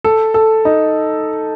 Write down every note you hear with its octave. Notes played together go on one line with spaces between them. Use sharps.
A4
A4
D#4